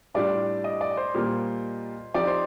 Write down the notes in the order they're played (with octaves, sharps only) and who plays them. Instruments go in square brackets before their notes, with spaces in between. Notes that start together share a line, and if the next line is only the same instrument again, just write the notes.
[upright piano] A2 G3 D4 F4 [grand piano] D5
[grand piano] D#5
D5
C5
[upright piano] A#2 G3 A#3 F4
[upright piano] F3 C4 D#4 G4 [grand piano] D5
[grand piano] C5